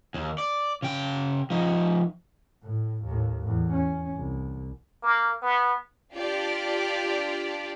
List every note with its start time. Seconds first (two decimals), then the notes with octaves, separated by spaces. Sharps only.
0.14 D#2
0.38 D5
0.82 C#3 G5
1.50 F3 D#4
2.63 A2
3.04 D#2 A2
3.42 E2 A2
3.73 C#4
4.16 C2
5.03 A#3
5.42 B3
6.14 D4 F4 G4 D5